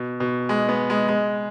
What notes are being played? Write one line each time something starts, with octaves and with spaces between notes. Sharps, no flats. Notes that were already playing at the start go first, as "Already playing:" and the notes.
Already playing: B2
B2
G#3
B3
G#3
G#3